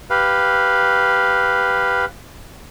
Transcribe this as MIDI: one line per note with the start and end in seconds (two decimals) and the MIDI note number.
0.10 2.05 67
0.10 2.05 71
0.10 2.05 77